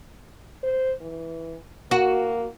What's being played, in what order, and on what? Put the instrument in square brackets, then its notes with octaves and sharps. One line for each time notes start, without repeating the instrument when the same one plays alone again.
[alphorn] C5
E3
[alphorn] A#3 [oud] F#4